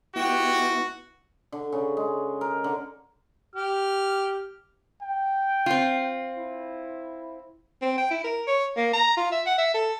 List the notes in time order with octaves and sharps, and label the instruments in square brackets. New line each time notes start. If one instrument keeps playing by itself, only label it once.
[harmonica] G#3 G4 G5 [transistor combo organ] B3 E4 [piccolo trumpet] F#4
[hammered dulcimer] D3
C#3
G#3
A#4
D3
[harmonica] G4 F6
[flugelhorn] G5
[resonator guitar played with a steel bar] C4 F4
[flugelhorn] E4
[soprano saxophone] C4
G5
E4
A#4
C#5
A#3
A#5
F4
E5
F#5
E5
A4